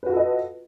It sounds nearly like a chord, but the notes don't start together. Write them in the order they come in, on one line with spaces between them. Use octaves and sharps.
B4 F#4 F4 A4 D#5